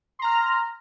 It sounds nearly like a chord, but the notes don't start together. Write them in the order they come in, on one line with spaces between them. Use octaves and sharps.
C6 A#5 F6